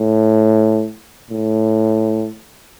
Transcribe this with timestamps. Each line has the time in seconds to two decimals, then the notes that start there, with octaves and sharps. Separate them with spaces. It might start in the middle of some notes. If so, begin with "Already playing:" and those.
Already playing: A2
1.30 A2